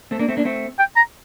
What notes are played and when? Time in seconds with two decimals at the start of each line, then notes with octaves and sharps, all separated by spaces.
0.11 A3 C4
0.19 A#3 D4
0.29 A3 C4
0.37 A#3 D4
0.45 A3 C4
0.79 G5
0.97 A#5